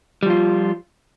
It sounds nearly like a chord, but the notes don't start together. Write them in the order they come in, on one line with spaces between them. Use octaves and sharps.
G3 F3 F4